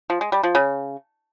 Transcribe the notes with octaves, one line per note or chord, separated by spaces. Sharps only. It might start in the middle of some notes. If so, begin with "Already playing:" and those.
F3
G#3
G3
F3
C#3